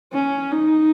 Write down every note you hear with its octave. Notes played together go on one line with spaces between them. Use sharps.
C#4
D#4